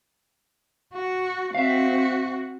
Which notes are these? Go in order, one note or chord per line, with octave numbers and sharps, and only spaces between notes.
F#4
C4 F#4 E5 F5